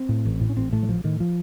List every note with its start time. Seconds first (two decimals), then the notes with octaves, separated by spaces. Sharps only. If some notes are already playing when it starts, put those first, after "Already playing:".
Already playing: C4
0.09 A2
0.25 A1
0.41 A2
0.49 C#4
0.57 A1 C4
0.72 A2 A3
0.83 F#3
0.88 A1 F3
1.04 A2 D#3
1.20 F3